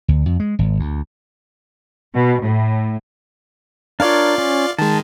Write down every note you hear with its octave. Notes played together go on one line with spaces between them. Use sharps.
D2
F2
G#3
G#1
D2
B2
A2
D4 F4 A#4 C#5 D5 F5
C#4
D#3 G#3 A5